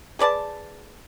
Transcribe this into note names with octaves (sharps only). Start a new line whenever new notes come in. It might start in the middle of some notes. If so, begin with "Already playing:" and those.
G#4 B4 D5 A5